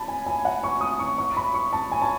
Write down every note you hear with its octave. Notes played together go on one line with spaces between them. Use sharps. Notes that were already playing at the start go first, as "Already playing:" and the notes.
Already playing: A5 B5
G#5
G#5
F#5
C#6
D#6
C#6
C#6
B5
C#6
A5
G#5
A5